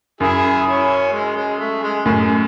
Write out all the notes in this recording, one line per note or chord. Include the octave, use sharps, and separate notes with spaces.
F#2 E4 G#4
C#4 E4
G#3
G#3
A3
G#3
F#2 A2 G#3